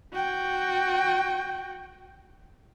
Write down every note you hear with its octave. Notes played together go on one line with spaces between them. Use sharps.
F#4 G5